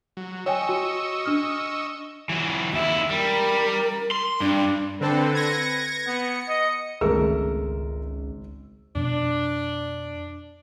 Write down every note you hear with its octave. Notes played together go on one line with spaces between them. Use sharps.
F#3
C#5 D#5 G5 G#5 C#6 E6
F#4
D4 D#6 F6
E3 F#3
D#2 E4 E5
G3 A#4
C6
G2 D4
D3 C4 A4 B4
G#6 A#6 C#7
B3 C#7
D#5
G#1 C#2 A3 G#4 A#4 E6
F2 B2 D4